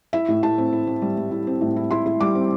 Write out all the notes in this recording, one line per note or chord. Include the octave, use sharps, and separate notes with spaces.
E4 E5
A2
A2 A5
C4
E4
C4
G3
G3
E4
C4
A2
E4
E4 C6
E4
G3 D6
C4